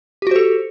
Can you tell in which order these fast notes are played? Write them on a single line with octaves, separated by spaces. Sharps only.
G4 F#4 C5 A4